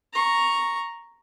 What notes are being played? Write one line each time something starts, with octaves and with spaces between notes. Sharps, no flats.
A#5 C#6